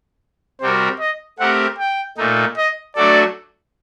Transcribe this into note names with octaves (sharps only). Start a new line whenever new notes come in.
C3 G3 C4 F#4 A#4 C5
D#5
A3 C4 G4 A#4 F#5
G5
A#2 A3 D#4
D#5
F#3 A3 D4 F#4 A4 D5